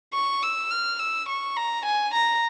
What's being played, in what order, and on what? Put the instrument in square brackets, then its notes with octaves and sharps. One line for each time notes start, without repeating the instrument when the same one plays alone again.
[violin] C#6
E6
F6
E6
C#6
A#5
G#5
A#5